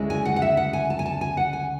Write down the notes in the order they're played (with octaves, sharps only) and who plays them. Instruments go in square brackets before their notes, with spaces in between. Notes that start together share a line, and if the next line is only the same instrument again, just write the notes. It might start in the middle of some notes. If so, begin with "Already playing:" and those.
Already playing: [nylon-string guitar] D2 C#3 G#3 C#4 E4
G#5
F#5
F#5
E5
F#5
G#5
A5
G#5
A5
G#5
F#5
G#5